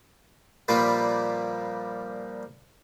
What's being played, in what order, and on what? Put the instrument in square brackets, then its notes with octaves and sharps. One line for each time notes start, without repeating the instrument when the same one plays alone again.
[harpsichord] A#2 F3 G3 A#3 B4 D5